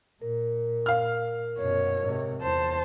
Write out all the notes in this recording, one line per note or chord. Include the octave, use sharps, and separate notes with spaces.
A#2 A#4
F5 F6
F#2 B2 C#5
G#2 C3
E2 C5 A5